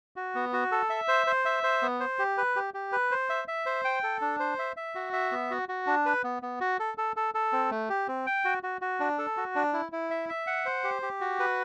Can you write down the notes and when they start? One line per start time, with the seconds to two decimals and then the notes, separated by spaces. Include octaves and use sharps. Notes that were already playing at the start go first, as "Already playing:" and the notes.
0.16 F#4
0.35 B3
0.53 F#4
0.71 A4
0.90 E5
1.08 C5
1.27 C5
1.45 E5
1.63 C5
1.82 B3
2.00 C5
2.19 G4
2.38 B4
2.56 G4
2.74 G4
2.92 B4
3.11 C5
3.30 E5
3.48 E5
3.66 C5
3.85 G5
4.03 A4
4.21 D4
4.40 C5
4.59 E5
4.77 E5
4.95 F#4
5.13 E5
5.32 B3
5.51 F#4
5.69 F#4
5.87 D4
6.06 B4
6.24 B3
6.43 B3
6.61 F#4
6.79 A4
6.98 A4
7.16 A4
7.34 A4
7.53 C4
7.71 A3
7.89 G4
8.08 C4
8.27 G5
8.45 F#4
8.63 F#4
8.82 F#4
9.00 D4
9.18 A4
9.37 F#4
9.55 D4
9.73 E4
9.92 E4
10.11 E5
10.29 E5
10.47 F#5
10.66 C5
10.84 G4
11.02 G4
11.21 F#4
11.39 B4